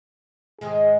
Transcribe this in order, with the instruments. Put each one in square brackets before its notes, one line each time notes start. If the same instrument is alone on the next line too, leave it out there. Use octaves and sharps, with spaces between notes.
[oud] G#2 D#3 G#3 [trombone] G#4